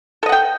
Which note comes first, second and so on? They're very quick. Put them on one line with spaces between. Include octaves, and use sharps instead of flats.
A4 D#5 F#5 G5